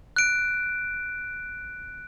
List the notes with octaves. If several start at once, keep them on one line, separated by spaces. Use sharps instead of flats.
F#6 D7